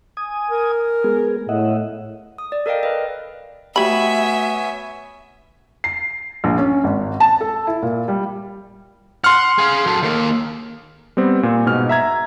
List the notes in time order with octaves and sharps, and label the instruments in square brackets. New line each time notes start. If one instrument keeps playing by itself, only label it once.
[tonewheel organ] G#5 D#6
[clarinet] A#4
[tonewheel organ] G#3 B3 G#4
[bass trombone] A2 [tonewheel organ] D#5 E5 F#5
[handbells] D#6
D5
A4 A#4 D5 D#5 F5 G5
B4 D#5
[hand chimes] A3 F#4 [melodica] B3 C#5 G#5 [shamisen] G4 B5 [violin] E5
[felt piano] C7
A#1
C#4
G#1
A5
A4
E4
A#2
G3
[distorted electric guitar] F#5 [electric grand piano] C6 F6
[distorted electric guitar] G#4 F5
F#3 A4
D#3 A#3
[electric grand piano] G3 B3 C4
A#2
G#2 B2 F6
E5 A#5 G#6